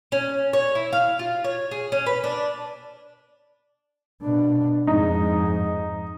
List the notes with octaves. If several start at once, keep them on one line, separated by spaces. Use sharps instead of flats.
C#4
C#5
E4
F5
F4
C#5
G#4
C#4
B4
D4
B2 D4
F2 G#2 D#4